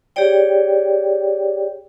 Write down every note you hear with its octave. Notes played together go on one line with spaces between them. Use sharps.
G4 G#4 C#5 D5 G5